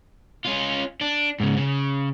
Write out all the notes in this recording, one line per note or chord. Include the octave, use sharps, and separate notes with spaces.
C#4 F4
D4
G#2 C#3
C#3